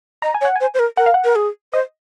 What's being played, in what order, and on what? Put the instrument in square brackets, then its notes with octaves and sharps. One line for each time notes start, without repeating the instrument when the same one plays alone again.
[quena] D#5 [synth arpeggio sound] A#5
[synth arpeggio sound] G#5
[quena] C#5
[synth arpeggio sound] F#5
G#5
[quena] C5
C5
A#4
[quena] A#4 [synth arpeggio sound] F#5
[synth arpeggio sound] F5
F#5
[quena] A#4
G#4
[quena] C5 [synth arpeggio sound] D#5